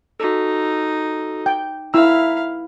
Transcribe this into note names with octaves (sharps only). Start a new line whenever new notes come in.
D#4 F#4 A4
G5
E4 E5 F5 A#5 E6